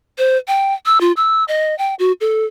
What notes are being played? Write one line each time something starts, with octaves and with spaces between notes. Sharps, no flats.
C5
G5
E6
F4
E6
D#5
G5
F#4
A4